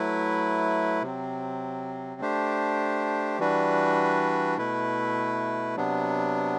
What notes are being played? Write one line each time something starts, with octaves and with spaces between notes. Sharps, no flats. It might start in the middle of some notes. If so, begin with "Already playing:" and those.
Already playing: F#3 A3 E4 B4
C3 F#3 C4
A3 D4 G4 C5
E3 G3 D4 F#4 B4
B2 A3 E4 B4
C3 F#3 B3 D4